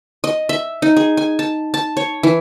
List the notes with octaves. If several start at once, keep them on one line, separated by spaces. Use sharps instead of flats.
D#5
E5
D#4
G#4
G#5
A5
A5
C#5
E3